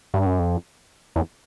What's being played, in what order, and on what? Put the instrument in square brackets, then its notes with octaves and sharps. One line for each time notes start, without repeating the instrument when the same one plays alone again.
[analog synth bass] G2
F#2
F2
E2